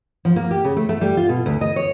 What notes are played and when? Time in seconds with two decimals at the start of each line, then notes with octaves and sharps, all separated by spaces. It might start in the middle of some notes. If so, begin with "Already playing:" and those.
0.25 F3
0.36 A#3
0.51 G4
0.65 C#3
0.77 A3
0.89 A3
1.01 G3
1.17 F4
1.29 B2
1.46 D2
1.61 D#5
1.76 C#5